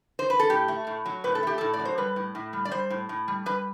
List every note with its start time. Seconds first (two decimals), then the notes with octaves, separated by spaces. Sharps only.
0.19 C5
0.30 B4
0.39 A4
0.50 A2 G4
0.68 A3
0.87 A2
1.06 F#3
1.24 A2 B4
1.35 A4
1.43 A3 G4
1.58 A2 A4
1.74 D5
1.80 F#3
1.85 C5
1.98 G3 B4
2.16 A2
2.35 A2
2.53 G3
2.65 D5
2.72 G3 C5
2.90 A2
3.09 A2
3.28 G3
3.46 G3 B4